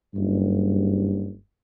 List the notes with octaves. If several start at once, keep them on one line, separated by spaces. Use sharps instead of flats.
F#1 G2